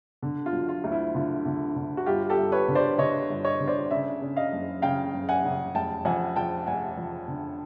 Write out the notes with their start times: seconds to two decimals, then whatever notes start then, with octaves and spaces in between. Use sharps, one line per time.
0.23 D3
0.46 F4
0.53 F#3
0.69 F4
0.84 D2
0.92 E4
1.14 D3 F4
1.46 D3
1.76 D3
1.97 F#4
2.06 G1 F4 G4
2.30 G4 A4
2.38 G1
2.52 B4 C#5
2.68 D3
2.75 C5 D5
2.98 D3 C#5 D#5
3.29 G1
3.45 C#5 D#5
3.60 D3
3.67 C5 D5
3.91 C#3 D5 E5
4.21 C#3
4.37 D#5 F5
4.53 F#1
4.82 C#3 F5 G5
5.13 F#1
5.29 F#5 G#5
5.44 C#3
5.75 F1 G5 A5
6.05 F2 F#5 G#5
6.36 F3 G5 A5
6.66 F1 F#5 G#5
6.97 F3
7.28 D3